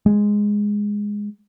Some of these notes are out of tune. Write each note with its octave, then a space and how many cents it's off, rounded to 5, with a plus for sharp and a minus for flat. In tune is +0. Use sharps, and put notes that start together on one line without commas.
G#3 -5